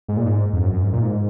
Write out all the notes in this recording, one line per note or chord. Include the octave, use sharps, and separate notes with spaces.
G#2
A#2
G#2
F2
F#2
F#2
G#2
A#2
G#2